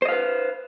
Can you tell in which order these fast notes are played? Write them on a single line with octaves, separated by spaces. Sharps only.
C5 D#5 F5 B4